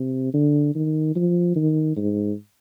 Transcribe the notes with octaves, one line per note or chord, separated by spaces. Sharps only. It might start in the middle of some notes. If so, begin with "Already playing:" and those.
Already playing: C3
D3
D#3
F3
D#3
G#2